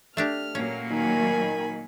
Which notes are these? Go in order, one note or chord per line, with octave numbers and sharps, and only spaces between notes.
A3 D4 G4 F6
A#2 F#3 A#3 C#4
D#3 G#5 B5